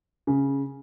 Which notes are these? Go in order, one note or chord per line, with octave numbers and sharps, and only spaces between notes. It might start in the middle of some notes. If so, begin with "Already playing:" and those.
C#3